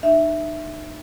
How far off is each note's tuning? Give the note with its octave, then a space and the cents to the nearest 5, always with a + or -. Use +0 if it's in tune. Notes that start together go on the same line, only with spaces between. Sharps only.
D#4 -40 E5 +0